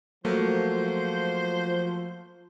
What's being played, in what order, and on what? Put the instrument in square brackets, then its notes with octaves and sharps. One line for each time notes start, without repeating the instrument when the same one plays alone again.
[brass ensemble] F3 [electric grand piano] F#3 A3 A#3 [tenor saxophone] C5